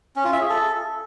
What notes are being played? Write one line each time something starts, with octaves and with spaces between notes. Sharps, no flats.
C#4
F4
E5
G#4
A4